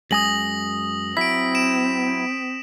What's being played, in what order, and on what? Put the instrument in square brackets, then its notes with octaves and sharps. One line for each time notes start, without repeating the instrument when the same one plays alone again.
[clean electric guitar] F#2 G#3 G#5 [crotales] D#6 A#6 F#7
[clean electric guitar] F#3 E4 [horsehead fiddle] C4 [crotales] B6 D7
[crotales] D7 E7